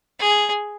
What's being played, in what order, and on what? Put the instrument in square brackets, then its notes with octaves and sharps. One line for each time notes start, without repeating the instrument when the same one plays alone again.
[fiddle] G#4